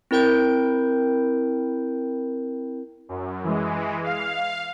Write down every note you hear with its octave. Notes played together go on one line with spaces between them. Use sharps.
C4 E4 A#4 G5 G6
F#2
E3 G#3
F5